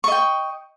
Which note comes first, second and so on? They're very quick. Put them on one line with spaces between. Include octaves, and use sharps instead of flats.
C#6 D#5 G5